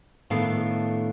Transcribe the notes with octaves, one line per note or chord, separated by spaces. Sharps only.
A2 D#3 B3 D4 A4 F5